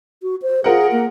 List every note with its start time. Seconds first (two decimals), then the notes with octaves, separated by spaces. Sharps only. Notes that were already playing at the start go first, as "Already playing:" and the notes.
0.22 F#4
0.42 C5
0.64 F4 G#4 A#4 F#5
0.92 A#3